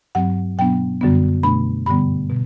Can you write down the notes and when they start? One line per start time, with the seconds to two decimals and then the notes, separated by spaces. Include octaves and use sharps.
0.15 G2 F#3 C4 F#5
0.58 B2 F#3 B3 D4 G5
1.01 F#2 D3 G3 B3 D4
1.43 B2 A3 D4 B5
1.86 G2 D3 G3 B3 B5
2.29 B2